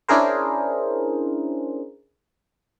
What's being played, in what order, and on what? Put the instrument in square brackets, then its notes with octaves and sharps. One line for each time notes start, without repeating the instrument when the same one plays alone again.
[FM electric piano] C#4 D4 E4 G#4 A#4 C5